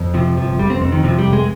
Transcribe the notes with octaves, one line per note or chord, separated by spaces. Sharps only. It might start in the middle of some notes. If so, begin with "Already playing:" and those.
Already playing: F2
C3 F3
G1 F3
F1 G3
C4
F2 C4
D#3
C3 F3
G3
F1
G#3